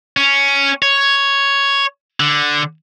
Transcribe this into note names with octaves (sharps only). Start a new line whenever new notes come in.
C#4
C#5
D3